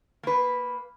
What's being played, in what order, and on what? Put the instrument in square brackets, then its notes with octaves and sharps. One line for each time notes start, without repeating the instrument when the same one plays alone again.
[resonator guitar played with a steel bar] A#3 B4